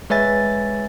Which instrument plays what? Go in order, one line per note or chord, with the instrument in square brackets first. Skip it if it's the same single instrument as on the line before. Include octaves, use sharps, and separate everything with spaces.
[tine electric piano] G#3 B4 C#5 E5 G#5 A6